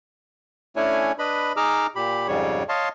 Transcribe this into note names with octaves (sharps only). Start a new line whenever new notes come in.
A3 C#4 D4 E4 C#5 G#5
D4 B4 D#5 B5
D#4 G#4 A#5 D6 E6 F6
A#2 G4 B5
F2 G#2 C#3 G3 C#5
C#5 D#5 F5 A5 C6